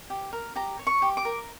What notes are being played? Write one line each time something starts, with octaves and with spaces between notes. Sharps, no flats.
G4
A#4
G4 A#5
C#5
C#6
G4
D6
A#4